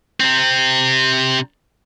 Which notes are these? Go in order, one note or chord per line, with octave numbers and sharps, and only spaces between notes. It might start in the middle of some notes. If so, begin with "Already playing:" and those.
C3 C4